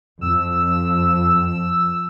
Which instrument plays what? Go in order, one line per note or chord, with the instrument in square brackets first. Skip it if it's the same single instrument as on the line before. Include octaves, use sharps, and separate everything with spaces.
[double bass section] F2 F3 [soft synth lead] E6